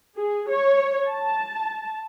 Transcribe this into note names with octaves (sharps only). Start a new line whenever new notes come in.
G#4
C#5
A5